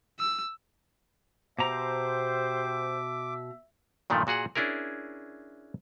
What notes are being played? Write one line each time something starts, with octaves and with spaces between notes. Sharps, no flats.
E6
B2 G4 C5 E5 A#5 D6
G2 A#2 D#3 F3 A3
A#2 F#4 G#4 F#5
C#4 D4 E4 G#4 A#4